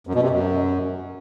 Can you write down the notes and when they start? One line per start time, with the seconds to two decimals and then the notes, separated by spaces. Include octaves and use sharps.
0.07 F#2
0.15 B2
0.23 C3
0.30 F#2